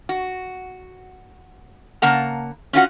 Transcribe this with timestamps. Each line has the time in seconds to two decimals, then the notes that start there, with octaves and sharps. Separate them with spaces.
0.09 F#4
2.02 C#3 A#3 F#5 A5 A#5
2.73 C#4 F4 F#4 F#5